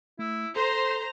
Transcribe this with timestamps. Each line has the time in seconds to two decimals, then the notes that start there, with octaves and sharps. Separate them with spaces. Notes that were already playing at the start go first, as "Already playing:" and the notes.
0.19 A3 E4
0.56 A4 C5 A#5 C6